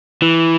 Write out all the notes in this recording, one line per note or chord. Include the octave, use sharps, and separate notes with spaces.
E3